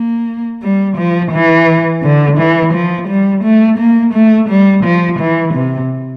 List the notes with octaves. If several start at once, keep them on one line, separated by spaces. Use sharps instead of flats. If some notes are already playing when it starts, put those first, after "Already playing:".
Already playing: A#3
G3
F3
E3
D3
E3
F3
G3
A3
A#3
A3
G3
F3
E3
C3